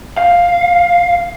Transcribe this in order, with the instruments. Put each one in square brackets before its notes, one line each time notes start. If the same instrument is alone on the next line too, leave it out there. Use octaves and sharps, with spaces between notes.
[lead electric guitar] F5